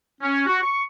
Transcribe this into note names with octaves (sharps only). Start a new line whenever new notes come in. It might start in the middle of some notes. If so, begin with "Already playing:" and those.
C#4
F#4
C#6